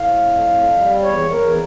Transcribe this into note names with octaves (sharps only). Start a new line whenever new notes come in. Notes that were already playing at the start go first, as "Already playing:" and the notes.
Already playing: A2 F5
F2
F2
G3
E2 C#5
E2 A#4